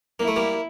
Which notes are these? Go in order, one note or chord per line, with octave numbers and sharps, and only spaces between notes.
A#3 E4
A3
G3 A#3